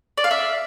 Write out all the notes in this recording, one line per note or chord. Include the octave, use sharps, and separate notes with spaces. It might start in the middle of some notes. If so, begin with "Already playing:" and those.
D5
F5
E5